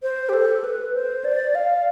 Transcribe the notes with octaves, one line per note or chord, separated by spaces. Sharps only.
C5
G4
A4
B4
C5
D5
F5